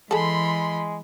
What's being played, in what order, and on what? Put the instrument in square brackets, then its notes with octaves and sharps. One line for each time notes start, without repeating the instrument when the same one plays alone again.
[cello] E3 [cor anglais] G#3 [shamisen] G#4 A4 [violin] B5 C6